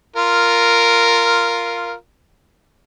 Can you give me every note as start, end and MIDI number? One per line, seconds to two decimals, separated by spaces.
0.16 1.94 65
0.16 1.94 70